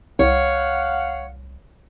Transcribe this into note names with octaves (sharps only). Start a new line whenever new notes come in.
C2 C#5 F5 F#5